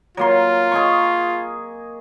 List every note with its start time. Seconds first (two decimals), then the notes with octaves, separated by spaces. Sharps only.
0.17 F#3 A#3 F4 C6
0.72 G#4 D#5 C#6